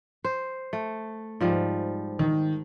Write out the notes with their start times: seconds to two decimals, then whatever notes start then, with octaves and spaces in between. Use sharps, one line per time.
0.24 C5
0.73 A3
1.40 G#2 F3 G3
2.19 D#3